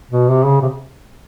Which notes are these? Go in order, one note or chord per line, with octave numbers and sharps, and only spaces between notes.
B2
C3
C#3
C3